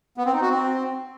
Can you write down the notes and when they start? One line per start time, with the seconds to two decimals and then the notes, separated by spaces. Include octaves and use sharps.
0.17 B3
0.25 C4
0.33 D#4
0.41 F#4
0.49 C4